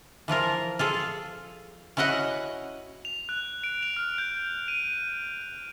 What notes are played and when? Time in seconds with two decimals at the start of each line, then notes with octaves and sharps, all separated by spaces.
0.28 E3 F3 F4 A#4
0.79 F4 G#4 A4
1.97 C#4 E4 F#4 D#5 F#5
3.05 F7
3.29 F#6
3.64 D7
3.83 F7
3.97 F6
4.18 G6
4.68 D#7